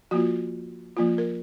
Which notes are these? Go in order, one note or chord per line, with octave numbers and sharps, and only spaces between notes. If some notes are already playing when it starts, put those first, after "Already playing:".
F3 A#3 F4 F#4
F3 A#3 F4
A#4